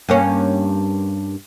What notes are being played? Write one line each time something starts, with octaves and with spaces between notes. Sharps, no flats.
G2 A#3 C#4